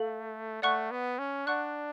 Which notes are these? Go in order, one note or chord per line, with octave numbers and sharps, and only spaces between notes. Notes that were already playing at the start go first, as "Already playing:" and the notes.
Already playing: A3 A4 F5
A3 D5 F#5 C#6 F#6
B3
C#4
D4 D5 F#5 C#6 F#6